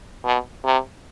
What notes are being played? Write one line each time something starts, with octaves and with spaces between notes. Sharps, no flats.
B2
C3